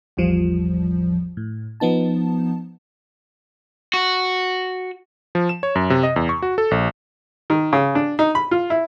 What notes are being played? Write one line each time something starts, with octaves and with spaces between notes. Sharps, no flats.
A1 E2 A2 F3 G3
A2
F3 B3 D#4 A5
F#4
F3
E7
C#5
F#2
C3
D#5
E2
C#6
F#4
A4
A#1
D#3
C#3
D4
D#4
B5
F4
E4